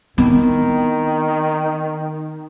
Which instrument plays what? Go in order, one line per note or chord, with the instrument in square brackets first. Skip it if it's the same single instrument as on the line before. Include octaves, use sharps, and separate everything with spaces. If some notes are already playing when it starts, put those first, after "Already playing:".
[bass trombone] D#3 [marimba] B3 [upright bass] C4 E4